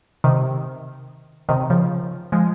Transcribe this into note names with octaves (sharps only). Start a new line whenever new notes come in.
C3 D#3
C3 D#3
C#3 F3
F3 G#3